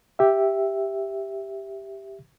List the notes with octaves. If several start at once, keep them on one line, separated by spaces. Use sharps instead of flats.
G4 E5